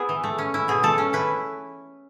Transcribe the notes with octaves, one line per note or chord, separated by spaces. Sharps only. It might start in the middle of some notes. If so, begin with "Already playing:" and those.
Already playing: B3 E4 G#4 B4
E3
A3
C#4
E4
B2 G#4
A3 A4
C#4
E4 B4